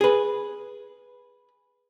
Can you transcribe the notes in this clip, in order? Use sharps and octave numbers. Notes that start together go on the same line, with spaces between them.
G#4 B4